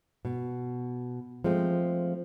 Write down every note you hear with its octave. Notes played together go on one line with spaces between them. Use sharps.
B2
F3 G#3 A3 C4